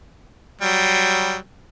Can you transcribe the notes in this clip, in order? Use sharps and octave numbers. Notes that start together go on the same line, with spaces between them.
F#3 G3